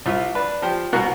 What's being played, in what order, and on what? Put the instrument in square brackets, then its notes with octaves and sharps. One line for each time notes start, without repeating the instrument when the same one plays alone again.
[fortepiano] C2 F4 E5
D4 B4
F3 G4
C2 B2 B3 F#4 A#4 F#6